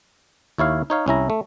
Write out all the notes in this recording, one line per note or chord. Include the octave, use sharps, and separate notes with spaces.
D#2 E4 C#5 F5
D#4 C#5 F5
C2 C#4 E4 A#5
A3